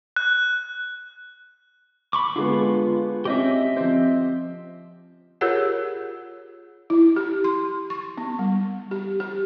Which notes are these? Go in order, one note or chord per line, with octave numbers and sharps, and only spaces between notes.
F#6
B5 C#6 D6
D3 G#3 B3 F4
C4 C#4 G4 D#5 E5
F3 C4
F4 G4 G#4 A#4 C#5 F#5
E4
G4
C6
C#6
B3
G3
G4
G4